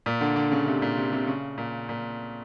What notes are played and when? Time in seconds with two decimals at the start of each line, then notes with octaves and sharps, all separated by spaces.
0.06 A#2
0.21 D3
0.36 D3
0.52 C#3
0.66 C3
0.82 A#2
0.97 C3
1.13 C3
1.27 C#3
1.58 A#2
1.89 A#2